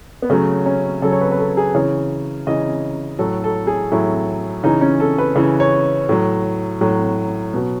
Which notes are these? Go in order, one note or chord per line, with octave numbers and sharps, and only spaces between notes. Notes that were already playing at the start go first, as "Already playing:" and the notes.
B3
C#3 F#3 A3
C#4
C#3 F#3 A4
C#5
B4
B4
A4
G#4
C#3 E3 C#5
C#3 E3 D#5
A2 F#3 A4
A4
G#4
A2 F#3 E4
C#3 E3 D#4
C#4
A4
B4
C#3 E3
C#5
A2 F#3
A2 F#3
B2 F#3